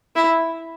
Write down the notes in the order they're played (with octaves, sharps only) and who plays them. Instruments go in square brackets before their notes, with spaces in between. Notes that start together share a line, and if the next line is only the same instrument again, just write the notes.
[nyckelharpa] E4